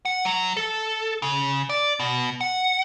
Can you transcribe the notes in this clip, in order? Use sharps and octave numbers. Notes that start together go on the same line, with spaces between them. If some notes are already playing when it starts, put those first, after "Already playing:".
F#5
F#3
A4
C#3
D5
B2
F#5